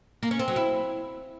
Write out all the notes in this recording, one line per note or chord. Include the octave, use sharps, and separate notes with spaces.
A#3
C#4
C4
F#3
E4